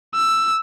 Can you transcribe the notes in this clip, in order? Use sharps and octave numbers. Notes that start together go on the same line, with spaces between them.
E6